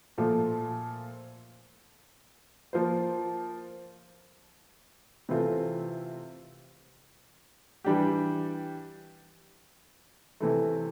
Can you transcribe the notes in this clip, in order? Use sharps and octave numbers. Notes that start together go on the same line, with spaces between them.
A#2 F3 A3
F3 A#3 F4 C5
C3 E3 A3 C4 F4
E3 G3 D4 G4
C3 E3 A3